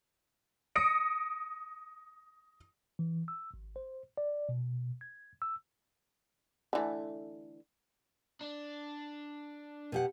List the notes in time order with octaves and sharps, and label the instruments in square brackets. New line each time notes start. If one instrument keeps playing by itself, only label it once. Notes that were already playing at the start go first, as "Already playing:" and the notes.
[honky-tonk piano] D#6 A#6 C#7 D7
[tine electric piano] E3
E6
G#1
C5
D5
B2
G#6
E6
[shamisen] D3 E3 A3
[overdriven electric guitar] D4
[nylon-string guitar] B2 G4 F#5